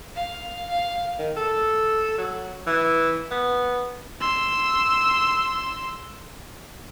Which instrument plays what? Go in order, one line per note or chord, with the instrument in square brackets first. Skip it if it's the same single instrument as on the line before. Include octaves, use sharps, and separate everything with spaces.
[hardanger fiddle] F5
F5
[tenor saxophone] D#3
A4
F#3
E3
B3
[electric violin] C6 E6